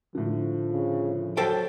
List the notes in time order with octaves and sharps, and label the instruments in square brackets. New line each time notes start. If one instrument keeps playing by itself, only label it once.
[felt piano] A2 D3 [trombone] F3
[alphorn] C#3
[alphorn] F#3 [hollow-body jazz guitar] A4 C5 G5